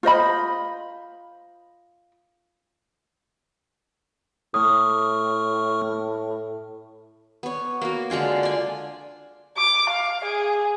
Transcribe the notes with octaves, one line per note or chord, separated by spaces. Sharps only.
F4 C5 D#5 B5
A2 A3 C#6 D#6 F6
B3 C#5
A#3 F#4
D3 G#3 F4 G#5
D5 G#5
D6
F5
G#4